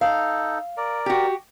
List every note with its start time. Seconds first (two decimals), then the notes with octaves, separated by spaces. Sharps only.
0.01 D#4 A4 F5
0.77 A#4 D5
1.06 F#4 G4